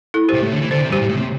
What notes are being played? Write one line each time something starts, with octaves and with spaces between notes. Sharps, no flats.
E4 A4
G4 C5
C3
A2
D3
E3
D3 C5
C3
G2 G4 C5
A2
A2
C3